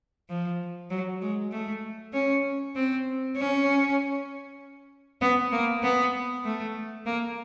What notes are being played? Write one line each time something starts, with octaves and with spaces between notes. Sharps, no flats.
F3
F#3
G#3
A3
C#4
C4
C#4
B3
A#3
B3
A3
A#3